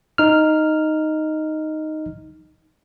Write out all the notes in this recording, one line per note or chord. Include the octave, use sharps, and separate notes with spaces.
D#4 F6